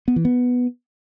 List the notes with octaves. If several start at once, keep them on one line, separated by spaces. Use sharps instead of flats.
B3
E3
B3